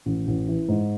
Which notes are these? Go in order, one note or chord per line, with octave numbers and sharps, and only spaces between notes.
A1
A1
E3
G#2